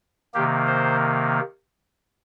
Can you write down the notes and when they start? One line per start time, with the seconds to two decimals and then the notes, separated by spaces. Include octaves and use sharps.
0.34 C3 D#3 A#3 G4
0.67 C5